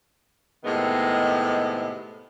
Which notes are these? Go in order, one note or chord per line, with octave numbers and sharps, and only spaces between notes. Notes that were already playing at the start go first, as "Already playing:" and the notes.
A2 C3 D#3 G#3 B3